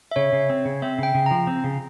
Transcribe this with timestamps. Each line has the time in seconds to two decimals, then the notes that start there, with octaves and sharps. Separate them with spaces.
0.11 E5
0.16 C#3 C#5
0.33 C#3
0.50 C4
0.65 C#3
0.82 C4 E5
0.99 C#3 G5
1.15 C#3
1.26 F3 A#5
1.47 C4
1.64 C#3